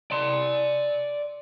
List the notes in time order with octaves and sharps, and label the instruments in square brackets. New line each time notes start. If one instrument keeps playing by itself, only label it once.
[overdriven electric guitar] D5 C6